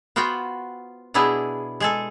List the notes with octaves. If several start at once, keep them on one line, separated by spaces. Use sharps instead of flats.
B3 F4 F#4 C5 G5
B2 B3 D4 E4 G#4
G#3 G#4 A4